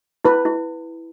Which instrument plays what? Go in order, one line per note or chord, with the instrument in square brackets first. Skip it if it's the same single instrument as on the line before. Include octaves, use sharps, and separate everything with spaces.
[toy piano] E4 [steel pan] B4
[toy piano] E4